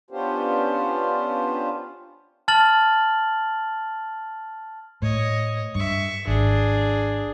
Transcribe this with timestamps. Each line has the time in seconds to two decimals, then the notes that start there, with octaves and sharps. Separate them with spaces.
0.11 B3 C#4 D4 F4 G4 C5
2.48 A5 F6 A6 F#7
5.02 A2 C#5 D#5
5.75 G2 E5 C#6
6.27 G#1 D4 G#4